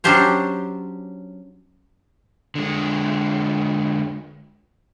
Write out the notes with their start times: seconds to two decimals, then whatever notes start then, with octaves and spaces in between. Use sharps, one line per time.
0.04 F#3 C#4 D4 G4 C5 C#5
2.55 D3 G#3